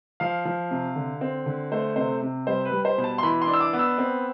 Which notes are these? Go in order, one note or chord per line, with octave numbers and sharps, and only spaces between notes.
F3 F5
F3
C3
D3
C4
D3
A3 C5
C3 C5
C3
G3 C5
B4
G3
C5
B2
A5
C6
E3 B5
C6
D4
E6
D6
B3
E6
C4